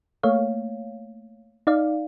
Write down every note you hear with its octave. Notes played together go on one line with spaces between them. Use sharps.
A3 A#3 C#5 F5
D#4 D5 F5